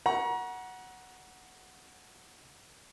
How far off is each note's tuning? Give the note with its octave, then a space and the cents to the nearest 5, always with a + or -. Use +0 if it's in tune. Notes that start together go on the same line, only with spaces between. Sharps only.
F#5 +0 A#5 +35 C#6 +0